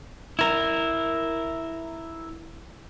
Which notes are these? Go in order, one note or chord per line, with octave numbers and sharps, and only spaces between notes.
E4 A#4